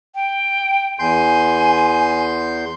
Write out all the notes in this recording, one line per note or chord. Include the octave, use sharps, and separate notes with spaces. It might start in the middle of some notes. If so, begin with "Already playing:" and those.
G5
E2 G#5 C6 G6